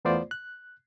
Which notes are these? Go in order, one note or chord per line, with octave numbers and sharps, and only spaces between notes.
E2 A3 B3 F4 C5 D5
F#6